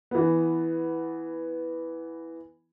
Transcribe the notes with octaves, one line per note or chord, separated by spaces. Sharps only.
E3 B3